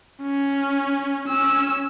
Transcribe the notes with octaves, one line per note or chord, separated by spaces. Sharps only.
C#4
C#4 E6